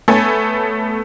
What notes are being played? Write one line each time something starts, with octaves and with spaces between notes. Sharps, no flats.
A3 B3 A4 C#5 G#5